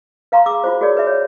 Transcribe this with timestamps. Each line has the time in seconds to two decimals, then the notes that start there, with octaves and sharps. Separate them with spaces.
0.32 B4 F5 A#5 C6 C#6
0.46 G#4 D6 E6
0.64 F4 F#4 C5
0.81 F#4 G#4 A#4 C#5 D5
0.95 G#4 B4 E5
1.07 C#5